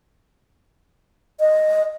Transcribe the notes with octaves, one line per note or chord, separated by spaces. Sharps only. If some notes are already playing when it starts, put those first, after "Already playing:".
D#5